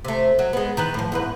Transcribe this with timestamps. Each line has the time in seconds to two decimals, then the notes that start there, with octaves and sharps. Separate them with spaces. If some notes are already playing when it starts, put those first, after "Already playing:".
0.04 C3 A3
0.39 F#3
0.53 G#3 B3
0.77 D#3 E3 B4
0.94 A2 F3
1.12 E2 G#2 B4